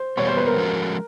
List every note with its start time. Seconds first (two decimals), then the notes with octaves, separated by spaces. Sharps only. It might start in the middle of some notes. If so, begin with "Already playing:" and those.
Already playing: C5
0.17 E2 B2 G3 B3 C#5
0.27 C5
0.37 B4
0.47 A#4
0.57 F3 G#3 C#4 F#4 A4